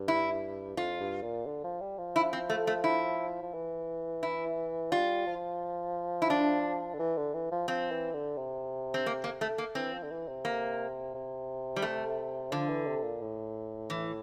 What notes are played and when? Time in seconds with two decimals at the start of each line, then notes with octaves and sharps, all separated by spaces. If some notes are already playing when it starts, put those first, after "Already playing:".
Already playing: G2
0.08 E4
0.76 F2 F4
1.00 G2
1.23 A#2
1.46 D3
1.64 F3
1.80 G3
1.98 F3
2.16 E4
2.33 C4
2.50 A3
2.67 A3
2.84 E4
3.42 F3
3.54 E3
4.23 E4
4.92 G3 F4
5.27 F3
6.22 E4
6.30 D4
6.94 D3
6.99 E3
7.17 D3
7.34 E3
7.51 F3
7.68 F3 C4
7.91 E3
8.14 D3
8.37 C3
8.94 C4
9.06 A#3
9.24 A#3
9.41 A3
9.58 A#3
9.75 E3 C4
9.93 F3
10.03 D3
10.11 E3
10.28 C3
10.45 A#3
11.14 C3
11.76 G3
11.82 A3
12.51 D3 F3
12.69 E3
12.87 C3
13.03 A#2
13.21 A2
13.90 E3